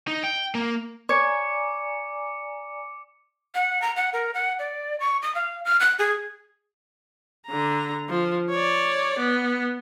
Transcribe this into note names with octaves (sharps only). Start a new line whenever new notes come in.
D#4
G5
A#3
C#5 D5 G#5 A#5 D6 C#7
F#5
A#5
F#5
A#4
F#5
D5
C#6
D#6
F5
F6
F#6
G#4
D3 A#5
F3
C#5 D5
B3